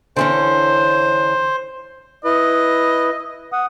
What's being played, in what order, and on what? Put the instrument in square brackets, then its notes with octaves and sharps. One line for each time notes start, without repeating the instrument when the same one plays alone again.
[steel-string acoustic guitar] D3 E3 C#4 [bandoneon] C5
[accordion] E4 B4 [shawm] D#5
[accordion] F#5 D#6